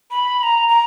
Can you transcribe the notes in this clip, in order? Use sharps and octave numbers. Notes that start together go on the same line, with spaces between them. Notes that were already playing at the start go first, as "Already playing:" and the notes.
B5
B5
A#5
A#5